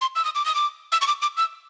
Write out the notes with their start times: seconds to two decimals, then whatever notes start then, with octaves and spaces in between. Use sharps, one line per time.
0.01 C6
0.15 E6
0.25 D#6
0.35 D6
0.45 D#6
0.55 D6
0.92 E6
1.01 C#6
1.07 D6
1.22 D6
1.37 E6